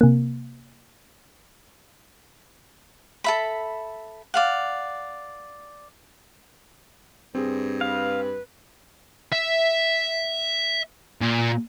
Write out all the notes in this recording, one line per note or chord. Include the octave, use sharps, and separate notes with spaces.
C3 A#3
A4 E5 B5
D5 F5 F#5
G2 C4 G#4
B4 F5
E5
A#2